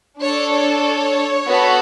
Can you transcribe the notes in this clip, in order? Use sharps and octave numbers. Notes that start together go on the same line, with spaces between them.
D4 A4 C#5
C#5
B3 F#4 A4